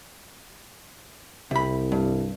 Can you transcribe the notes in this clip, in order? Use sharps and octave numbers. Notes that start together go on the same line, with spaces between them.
C2 C3 B5
G2